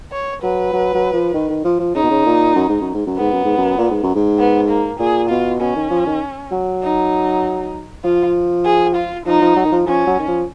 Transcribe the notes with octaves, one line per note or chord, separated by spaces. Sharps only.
C#5
F#3 B4
F#3
F#3
F3
D#3
D#3
F3
F3
C#3 D#4
B2
C#3
A#2
F#2
G#2
F#2
G#2
F#2
G#2 B3
F#2
G#2
F#2
A#2
G#2
F#2
G#2
B3
A#3
A#2 G#4
B2 F4
B2 C#4
D#3
F3
D#3
F#3
D#4
F3 F4
G#4
F4
F3 D#4
F3
F#3
D#3
F3
F3 C#4
F#3
D#3
F3